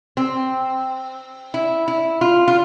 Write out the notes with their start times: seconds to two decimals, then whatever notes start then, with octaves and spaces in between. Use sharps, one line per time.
0.17 C4
1.54 E4
1.88 E4
2.21 F4
2.48 F4